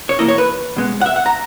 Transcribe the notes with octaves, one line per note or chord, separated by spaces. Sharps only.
C#5
E2 B2 A#3 E4 D#5
C#5
B4
B2 G#3 B3
F#5
E5
F#5
A#5